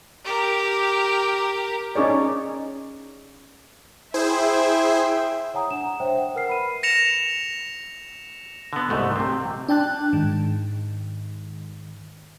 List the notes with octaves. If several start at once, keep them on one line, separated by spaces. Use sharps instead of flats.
G4 A#4
C#4 D#4 G#4 C#5 D5
E4 G#4 C5 E5 G5
C#5 F#5 G#5 A#5 D#6
D4 E7
C5 C#5 E5 G5
F#5
A#4 B4 F6 C7
B5 D#7
A#6 C#7 E7 F7
D3 B3
C2 G#2 A3
C3 C4
D4 G5 A5 F#6
G#2 D#3